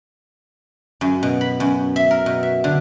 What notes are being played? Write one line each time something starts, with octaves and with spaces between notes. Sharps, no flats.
F#2
B2
B5
F#2
E5
A#4
B2
E5
D3